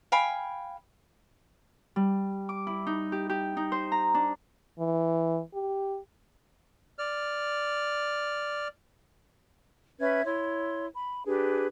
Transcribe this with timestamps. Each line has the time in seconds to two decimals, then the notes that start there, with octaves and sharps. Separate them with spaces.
0.12 F5 G5 G#5 B5
1.96 G3
2.49 D6
2.67 E4
2.87 D#4
3.12 G4
3.30 G4
3.57 D#4
3.72 C5
3.92 A#5
4.15 D4
4.78 E3
5.54 G4
6.98 D5 F6
10.00 C#4 B4 E5 G#6
10.25 E4 C#5 C6
10.95 B5
11.26 D4 G4 G#4 B4